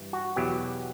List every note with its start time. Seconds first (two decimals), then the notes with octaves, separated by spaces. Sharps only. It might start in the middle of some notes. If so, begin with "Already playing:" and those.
Already playing: G2 E3
0.13 F#4
0.36 E2 B2 F#3 G4